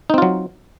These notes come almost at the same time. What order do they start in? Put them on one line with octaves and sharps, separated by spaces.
D#4 C4 F4 F#3